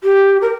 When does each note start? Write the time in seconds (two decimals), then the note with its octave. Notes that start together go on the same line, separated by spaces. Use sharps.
0.03 G4
0.41 A#4